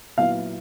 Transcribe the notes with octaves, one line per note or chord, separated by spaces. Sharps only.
A#2 F#3 B3 E4 F5